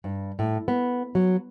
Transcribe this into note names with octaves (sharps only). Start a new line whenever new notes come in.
G2
A2
B3
F#3